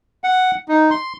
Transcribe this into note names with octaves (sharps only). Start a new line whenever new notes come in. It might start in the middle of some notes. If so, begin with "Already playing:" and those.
F#5
D#4
C6